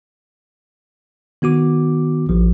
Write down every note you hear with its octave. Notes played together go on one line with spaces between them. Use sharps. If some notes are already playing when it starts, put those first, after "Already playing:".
D#3 B3 F#4 D6
A1 F3